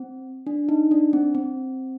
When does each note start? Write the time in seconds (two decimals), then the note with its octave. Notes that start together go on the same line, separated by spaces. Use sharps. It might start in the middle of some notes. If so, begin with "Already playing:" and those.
Already playing: C4
0.47 D4
0.69 D#4
0.91 D4
1.13 C4
1.35 C4